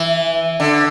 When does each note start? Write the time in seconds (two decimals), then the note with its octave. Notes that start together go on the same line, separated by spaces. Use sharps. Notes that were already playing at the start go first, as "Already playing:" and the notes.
Already playing: E3
0.60 D3